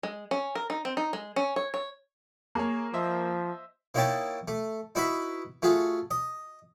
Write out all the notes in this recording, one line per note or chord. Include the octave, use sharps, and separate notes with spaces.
G#3
C#4
A#4
D#4
C4
D#4
G#3
C#4
C#5
C#5
A#3 G#4 C#5
F3 C5 D#5 E5
A#3 D#4 E4 C#5 G5 A5
A3
D#4 E4 F#4 B4 E5 B5
A3 F4 F#4 G#4
D#5